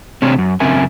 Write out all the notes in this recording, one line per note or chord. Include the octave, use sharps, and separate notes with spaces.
C3 A3 C4 D4 C5 C#5
F#2
F#2 C#3 C4 A#4 E5 G#5